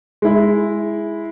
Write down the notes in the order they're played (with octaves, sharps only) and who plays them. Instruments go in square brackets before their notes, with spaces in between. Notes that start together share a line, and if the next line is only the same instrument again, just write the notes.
[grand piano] G#3 E4